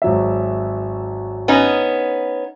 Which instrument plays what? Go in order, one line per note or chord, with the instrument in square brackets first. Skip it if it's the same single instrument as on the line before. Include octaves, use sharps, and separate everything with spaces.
[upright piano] G#1 F#3 E5
[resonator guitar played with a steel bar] B3 C#4 D#4